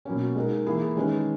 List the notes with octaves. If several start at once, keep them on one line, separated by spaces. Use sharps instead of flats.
B2 F#3 A#3 C#4
G#3 D#4 A#4
E3 A#3 E4 G#4
D#3 G#3 C#4 G#4 B4